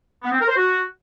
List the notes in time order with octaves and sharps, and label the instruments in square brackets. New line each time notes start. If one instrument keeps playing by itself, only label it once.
[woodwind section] B3
C4
A#4
C5
F#4